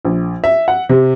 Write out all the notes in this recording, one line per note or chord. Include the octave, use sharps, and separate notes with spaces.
A#1
E5
F#5
C3